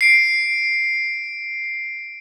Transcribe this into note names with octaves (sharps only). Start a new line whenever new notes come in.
C7 D7